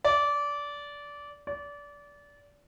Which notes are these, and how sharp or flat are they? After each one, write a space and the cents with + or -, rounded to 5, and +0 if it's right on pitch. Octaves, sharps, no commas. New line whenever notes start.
D5 -20
D5 -25